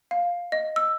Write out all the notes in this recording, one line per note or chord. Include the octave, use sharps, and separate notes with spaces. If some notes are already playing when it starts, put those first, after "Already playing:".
F5
D#5
E6